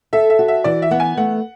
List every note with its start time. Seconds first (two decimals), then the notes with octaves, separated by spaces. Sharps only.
0.13 A4 E5
0.30 E5
0.39 F#4
0.48 E5
0.64 E3 D5
0.82 E5
0.91 B3 F#5
1.00 G#5
1.17 A3 F#5